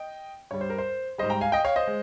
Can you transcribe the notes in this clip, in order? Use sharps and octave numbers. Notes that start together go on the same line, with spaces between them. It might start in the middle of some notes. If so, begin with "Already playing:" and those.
Already playing: D#5 G5
G2 G3 C#5
C5
A#4
C5
G#2 G3 C5 D#5
G5 A#5
F5 G#5
D#5 G5
C#5 F5
C5 D#5
G#3